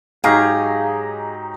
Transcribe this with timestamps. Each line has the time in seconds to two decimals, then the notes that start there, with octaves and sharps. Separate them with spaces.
0.24 G#2 F#3 D#4 G4 G#4 F5